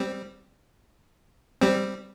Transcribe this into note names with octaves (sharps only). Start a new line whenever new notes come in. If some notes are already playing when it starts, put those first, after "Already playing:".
Already playing: G3 C4
G3 C4